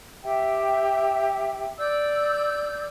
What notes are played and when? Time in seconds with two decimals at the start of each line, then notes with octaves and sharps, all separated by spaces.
0.23 G4 E5 G5
1.79 D5 E6 G6